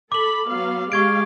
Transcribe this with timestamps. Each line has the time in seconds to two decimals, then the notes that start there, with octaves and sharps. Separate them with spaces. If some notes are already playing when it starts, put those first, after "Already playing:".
0.12 A4 B5 D6 F#7
0.49 F#3 B3 F5
0.92 G#3 G4 F5 C#6 G#6 D7